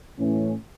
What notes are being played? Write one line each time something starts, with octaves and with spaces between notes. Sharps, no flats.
A2 E3 A3 C#4